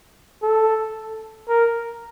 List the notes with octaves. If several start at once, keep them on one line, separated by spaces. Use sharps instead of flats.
A4
A#4